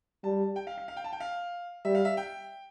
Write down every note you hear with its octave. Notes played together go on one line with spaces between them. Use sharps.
G3 A5
G5
F5
F5
F5
G5
A5
G5
F5
G3 E5
F5
E5
G5